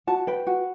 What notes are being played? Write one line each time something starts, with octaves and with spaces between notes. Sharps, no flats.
F#4 A5
B4 G5
F#4